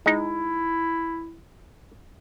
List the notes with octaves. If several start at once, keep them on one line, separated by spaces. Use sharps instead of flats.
G#3 D#4 E4